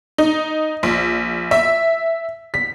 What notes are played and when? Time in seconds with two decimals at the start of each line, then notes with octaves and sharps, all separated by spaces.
0.18 D#4
0.83 A#1
1.51 E5
2.54 B6